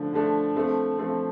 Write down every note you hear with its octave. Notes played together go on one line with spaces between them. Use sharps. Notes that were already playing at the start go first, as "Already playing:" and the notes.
Already playing: D3 F3 A3 D4
D3 F3 A3 D4
F3 A3 C4
F3 A3 C4